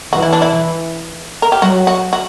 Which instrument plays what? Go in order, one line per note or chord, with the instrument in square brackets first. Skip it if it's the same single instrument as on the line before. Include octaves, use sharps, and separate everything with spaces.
[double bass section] E3 [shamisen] F#4
[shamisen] E4
D4
E4
A#4
G4
[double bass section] F#3 [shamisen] F#4
[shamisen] F#4
F#4